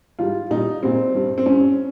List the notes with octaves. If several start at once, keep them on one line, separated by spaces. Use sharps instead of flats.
G#2 G3 F4
A#2 G3 D#4
A#2 G3 C4
G2 G3
C4
G2 G3 C#4